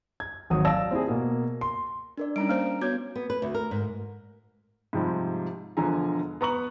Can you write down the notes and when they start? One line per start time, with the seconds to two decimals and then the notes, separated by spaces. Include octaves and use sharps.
0.20 G#6
0.50 G#1 F#3 D#6
0.65 D5 F5 A5 E6 A#6
0.91 C4 E4 G#4
1.08 B2 A#3
1.61 C6
2.17 D4 A#4 D5
2.36 G3 C#4 D#4 A#5 D7
2.49 A#3 D4 C5
2.81 B3 F#4 C#5 G6 G#6
3.16 B3
3.30 B4
3.42 D2
3.54 A#4
3.71 G#2
4.93 G#2 C3 F3 G3
5.77 E1 D3 F3 G#5 A#5
6.41 B3 A#5 C#6 F#7